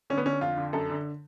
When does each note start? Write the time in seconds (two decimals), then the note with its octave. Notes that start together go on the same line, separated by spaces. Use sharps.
0.10 D3 C#4
0.17 B3
0.26 D3 C#4
0.41 F2 F4
0.58 D3
0.73 F#2 A4
0.89 D3